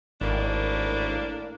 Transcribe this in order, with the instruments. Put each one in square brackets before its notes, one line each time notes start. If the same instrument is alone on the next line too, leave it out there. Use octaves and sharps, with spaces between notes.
[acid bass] G#1 [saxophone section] A2 A#3 D4